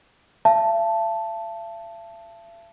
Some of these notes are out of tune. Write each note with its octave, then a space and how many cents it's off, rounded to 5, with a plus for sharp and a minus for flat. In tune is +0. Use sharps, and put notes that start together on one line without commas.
E5 +45 A5 +0